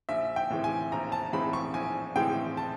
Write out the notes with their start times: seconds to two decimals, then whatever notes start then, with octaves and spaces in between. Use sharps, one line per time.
0.09 A#1 E5
0.36 G5
0.50 A2 E3 G#3 C4
0.64 G#5
0.92 A#1 A#5
1.12 A5
1.33 A2 E3 G#3 C4 B5
1.53 C#6
1.74 A#1 G#5
2.16 A2 E3 G#3 C4 G5
2.57 A5